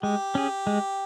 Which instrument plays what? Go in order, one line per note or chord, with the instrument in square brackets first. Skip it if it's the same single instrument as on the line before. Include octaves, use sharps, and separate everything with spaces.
[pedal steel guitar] G#3 [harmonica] G4
[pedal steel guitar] C#4 G#4
G#3